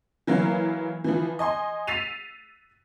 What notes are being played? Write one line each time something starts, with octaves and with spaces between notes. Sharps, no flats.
E3 F#3 A#3 F5
E3 F3
D#5 G#5 C6
E6 A6 B6 C7 D#7 F7